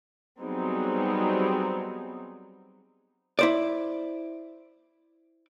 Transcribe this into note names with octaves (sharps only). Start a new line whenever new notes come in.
F#3 G3 B3 C4 D#4 G#4
E4 C5 D5